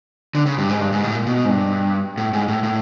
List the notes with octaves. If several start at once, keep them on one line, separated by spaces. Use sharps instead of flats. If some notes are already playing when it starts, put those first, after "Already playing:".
D3
C#3
G2
G#2
G2
G#2
A2
A#2
B2
G#2
G2
A2
G#2
A2
A2